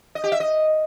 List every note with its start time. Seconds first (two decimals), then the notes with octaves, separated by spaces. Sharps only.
0.15 D#5
0.24 G4
0.32 E5
0.40 D#5